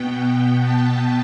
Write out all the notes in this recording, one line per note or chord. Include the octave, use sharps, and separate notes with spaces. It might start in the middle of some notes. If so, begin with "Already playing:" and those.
Already playing: B2 B3 G5
A5